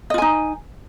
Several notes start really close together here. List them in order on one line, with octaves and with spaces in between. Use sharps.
D#5 F4 G#5 D#4